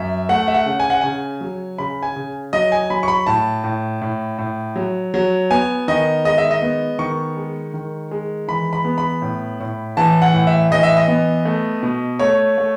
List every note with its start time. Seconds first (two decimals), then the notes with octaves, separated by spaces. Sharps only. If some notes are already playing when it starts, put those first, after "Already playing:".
Already playing: F#2 E5
0.29 A3 F#5
0.48 E5
0.54 F#5
0.66 C#3
0.80 G#5
0.90 F#5
1.01 C#3 G#5
1.41 F#3
1.78 C#3 B5
2.03 G#5
2.16 C#3
2.53 F#3 D#5
2.72 G#5
2.90 F#3 B5
3.03 C#6
3.08 B5
3.27 A2 A5
3.64 A2
4.02 A2
4.38 A2
4.76 F#3
5.14 F#3
5.50 B3 G#5
5.88 D#3 D#5
6.24 G#3 D#5
6.38 E5
6.51 D#5
6.62 B3
6.99 D#3 C#6
7.36 G#3
7.74 D#3
8.11 G#3
8.48 E3 B5
8.73 B5
8.85 B3
8.98 B5
9.22 A2
9.60 A2
9.97 E3 A5
10.22 F#5
10.33 A2
10.47 E5
10.71 E3 D#5
10.83 E5
10.97 D#5
11.08 B3
11.45 A3
11.83 B2
12.19 A3 C#5
12.58 A3